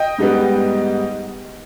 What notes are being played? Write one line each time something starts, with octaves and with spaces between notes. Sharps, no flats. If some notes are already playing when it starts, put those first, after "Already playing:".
Already playing: D#5 G5
G#2 G3 B3